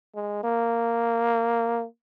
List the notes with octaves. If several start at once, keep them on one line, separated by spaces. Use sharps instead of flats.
G#3
A#3